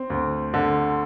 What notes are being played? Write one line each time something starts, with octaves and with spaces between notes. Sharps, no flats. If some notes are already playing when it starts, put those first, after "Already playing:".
Already playing: C4
D2
D3